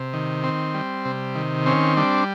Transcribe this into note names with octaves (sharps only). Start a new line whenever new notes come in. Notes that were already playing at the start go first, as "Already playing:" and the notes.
Already playing: C3
D#3
C4
G3
C3
D#3
C4 C#4
G3 D4